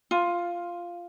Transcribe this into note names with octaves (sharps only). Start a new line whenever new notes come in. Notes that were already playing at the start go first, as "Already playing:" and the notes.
F4